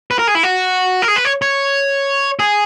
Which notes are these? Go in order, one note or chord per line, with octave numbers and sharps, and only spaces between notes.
B4
A#4
G#4
E4
F#4
A#4
G#4
B4
C#5
C#5
G#4